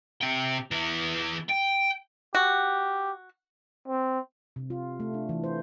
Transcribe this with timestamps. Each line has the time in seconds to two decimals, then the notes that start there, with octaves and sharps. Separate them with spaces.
0.21 C3 G5
0.71 E3 B3
1.49 G5
2.35 F#4 G4
3.88 C4
4.56 C3
4.70 F4
5.00 A3
5.14 D4
5.29 E3
5.44 C5